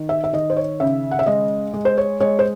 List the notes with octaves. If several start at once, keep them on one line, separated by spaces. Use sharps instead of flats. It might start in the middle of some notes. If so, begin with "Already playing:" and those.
Already playing: D#3
E5
E5
D#3 D#5
C5
C#5
C#3 E5
F#5
E5
G#3 D#5
G#3
C5
C#5
G#3 C#5
C5